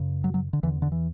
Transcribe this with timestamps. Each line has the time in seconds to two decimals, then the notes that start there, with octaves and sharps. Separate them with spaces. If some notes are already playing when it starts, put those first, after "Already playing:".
Already playing: F#2 C#3
0.24 F#3
0.34 F#3
0.53 D3
0.63 E2 D3 E3
0.82 D3
0.92 E3